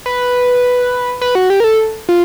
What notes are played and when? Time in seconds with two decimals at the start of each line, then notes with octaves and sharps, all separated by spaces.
0.06 B4
1.21 B4
1.35 F#4
1.50 G4
1.60 A#4
1.64 A4
2.09 F4